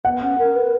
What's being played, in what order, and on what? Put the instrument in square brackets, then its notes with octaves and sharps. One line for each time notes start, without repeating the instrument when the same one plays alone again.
[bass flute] B3 [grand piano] F#5
[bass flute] C#4
A#4
B4